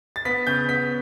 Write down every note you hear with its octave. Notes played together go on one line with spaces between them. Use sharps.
A6
B3 B6
C#3 G6
B3 B6